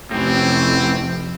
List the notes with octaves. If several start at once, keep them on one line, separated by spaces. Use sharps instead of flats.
F2 A2 C3 E3 C4